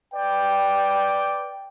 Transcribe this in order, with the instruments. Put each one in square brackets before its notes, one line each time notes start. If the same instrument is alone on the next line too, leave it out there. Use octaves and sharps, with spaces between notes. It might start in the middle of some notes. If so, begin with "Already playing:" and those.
[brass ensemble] B4 D5 G5